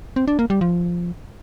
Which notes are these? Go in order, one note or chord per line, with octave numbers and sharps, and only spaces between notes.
C4
D4
A#3
G3
F3